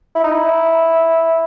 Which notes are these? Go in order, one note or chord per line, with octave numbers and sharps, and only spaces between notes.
E4
D#4
E4